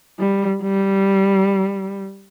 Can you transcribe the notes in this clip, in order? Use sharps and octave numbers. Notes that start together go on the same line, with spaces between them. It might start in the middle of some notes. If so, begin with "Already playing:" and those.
G3
G3